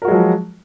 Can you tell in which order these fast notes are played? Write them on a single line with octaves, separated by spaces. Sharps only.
A#4 F#4 G#3 F#3 F3